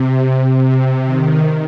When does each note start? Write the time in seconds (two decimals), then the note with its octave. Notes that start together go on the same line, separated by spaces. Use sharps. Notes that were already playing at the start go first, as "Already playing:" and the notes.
Already playing: C3
1.05 D#3